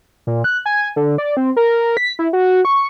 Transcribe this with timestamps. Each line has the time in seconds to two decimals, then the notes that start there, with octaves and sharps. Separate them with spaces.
0.27 A#2
0.44 F#6
0.66 G#5
0.96 D3
1.18 D5
1.37 C4
1.56 A#4
1.97 B6
2.19 E4
2.33 F#4
2.65 C#6